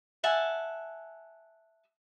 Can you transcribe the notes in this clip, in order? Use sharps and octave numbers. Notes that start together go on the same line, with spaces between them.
E5 F#5 G#5 A5